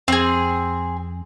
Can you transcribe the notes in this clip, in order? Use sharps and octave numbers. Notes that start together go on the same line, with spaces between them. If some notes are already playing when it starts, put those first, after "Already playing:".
F2 C4 G#4